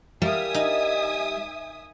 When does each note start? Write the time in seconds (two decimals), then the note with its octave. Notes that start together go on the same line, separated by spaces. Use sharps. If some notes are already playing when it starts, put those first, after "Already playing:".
0.22 G3 A#3 E5 G#5 D#6
0.54 D#4